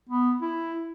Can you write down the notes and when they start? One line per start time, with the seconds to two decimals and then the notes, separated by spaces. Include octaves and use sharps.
0.09 B3
0.42 E4